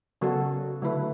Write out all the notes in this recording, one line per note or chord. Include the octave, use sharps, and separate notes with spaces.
C#3 F#3 B3 F#4 A4
D3 F#3 A3 E4 B4